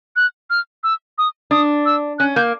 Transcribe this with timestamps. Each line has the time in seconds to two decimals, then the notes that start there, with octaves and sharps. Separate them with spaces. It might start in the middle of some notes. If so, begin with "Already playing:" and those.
0.16 F#6
0.50 F6
0.84 E6
1.18 D#6
1.51 D4 D#6
1.86 E6
2.19 C#4 F#6
2.36 A#3 G6